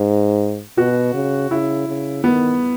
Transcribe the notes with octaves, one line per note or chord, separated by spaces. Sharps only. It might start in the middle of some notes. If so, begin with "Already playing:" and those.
Already playing: G#2
B2 F#4
C#3
C#3 E4
C#3
D#3 B3